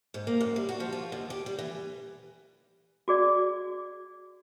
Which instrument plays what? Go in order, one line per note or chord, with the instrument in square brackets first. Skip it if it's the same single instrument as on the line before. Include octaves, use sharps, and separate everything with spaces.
[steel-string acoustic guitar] G#2
A#3
F#2
G3
F#4
F3
F4
D#2
G4
G3
E3
[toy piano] F#4 G#4 D5